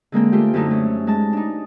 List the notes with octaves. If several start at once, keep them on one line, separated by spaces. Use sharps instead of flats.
D3 G#3 A#3 C4
A3 F4 G4
F#2 D3 A3 D#4
A3 C#4
G#3 A5
D4 D#4